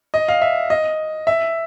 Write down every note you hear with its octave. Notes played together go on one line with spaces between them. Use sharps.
D#5
F5
E5
D#5
E5